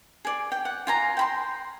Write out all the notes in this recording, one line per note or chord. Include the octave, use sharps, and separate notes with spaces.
G#4 D5
G5
F#5
F4 G#5 A#5
G5 B5 C6